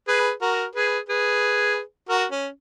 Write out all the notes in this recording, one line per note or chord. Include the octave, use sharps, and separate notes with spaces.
G#4 B4
F#4 A#4
G#4 B4
G#4 B4
F#4 A#4
C#4